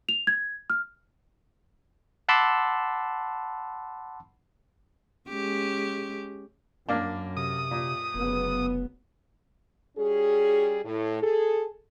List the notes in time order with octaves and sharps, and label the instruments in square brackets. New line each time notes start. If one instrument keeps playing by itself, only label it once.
[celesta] F7
G#6
F6
[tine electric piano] F#5 A5 B5 C6 D6 E6
[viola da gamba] G#3 C#4 G4
[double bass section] F#2 [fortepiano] A#3 D4
[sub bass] C3 [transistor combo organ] D#6
[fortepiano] A#2
[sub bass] F1 [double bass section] F#2 C#3 B3
[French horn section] G3 C#4 F#4 G#4
A2
G#4 A4